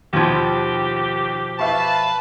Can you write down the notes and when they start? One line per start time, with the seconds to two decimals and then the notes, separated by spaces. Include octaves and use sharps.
0.13 D#2 B2 F3 G4 G#6
1.59 B4 E5 F5 A5 C#6